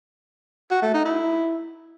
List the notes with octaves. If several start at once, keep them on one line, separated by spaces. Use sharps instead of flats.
F#4
A3
D#4
E4